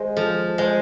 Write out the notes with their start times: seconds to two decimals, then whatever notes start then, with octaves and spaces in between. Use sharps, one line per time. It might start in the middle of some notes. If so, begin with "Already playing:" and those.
Already playing: G#3 C5
0.17 F3 A4
0.58 G#3 C5